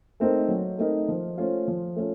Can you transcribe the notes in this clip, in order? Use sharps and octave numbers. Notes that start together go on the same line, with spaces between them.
A3 C4 D#4 A#4
F#3
A3 C4 D#4 A#4
F3
A3 C#4 F4 C5
F3
A3 C#4 F4